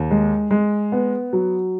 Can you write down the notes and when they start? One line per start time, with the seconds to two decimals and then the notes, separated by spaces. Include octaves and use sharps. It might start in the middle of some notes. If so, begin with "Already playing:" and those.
Already playing: D#2
0.11 G#3
0.51 G#3
0.92 B3
1.33 F#3